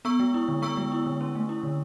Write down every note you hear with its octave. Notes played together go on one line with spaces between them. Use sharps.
B3 C#6 E6
G#3
E4
D3
B3 C#6 E6
G#3
E4
D3
C#4
A3
E4
D3